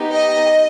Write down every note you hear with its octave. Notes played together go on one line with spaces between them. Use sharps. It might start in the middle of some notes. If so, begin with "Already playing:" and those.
Already playing: B3 D#4 G4
D#5